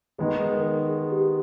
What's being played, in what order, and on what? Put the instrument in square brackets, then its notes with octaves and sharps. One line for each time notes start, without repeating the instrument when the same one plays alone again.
[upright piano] D#3 G#3 B3 [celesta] G#4
[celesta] A#4
G#4
G4